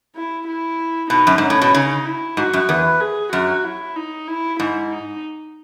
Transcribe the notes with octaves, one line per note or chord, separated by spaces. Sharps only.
E4
E4
B2 D#4
F#2
G#2 C#4
A2
B2
C#3 D#4
E4
G#2 F#4
F#2
E2 B4
G#4
F#2 F#4
E4
D#4
E4
G#2 E4
D#4